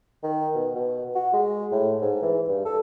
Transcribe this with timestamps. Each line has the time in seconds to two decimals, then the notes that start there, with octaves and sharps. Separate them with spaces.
0.23 D#3
0.55 B2
0.75 B2
1.15 F#4
1.33 G#3
1.72 A2
2.02 G#2
2.22 E3
2.48 G2
2.65 A4